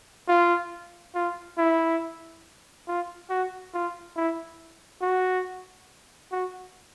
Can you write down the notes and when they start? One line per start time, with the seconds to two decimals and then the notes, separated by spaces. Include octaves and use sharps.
0.29 F4
1.15 F4
1.58 E4
2.88 F4
3.30 F#4
3.74 F4
4.16 E4
5.02 F#4
6.32 F#4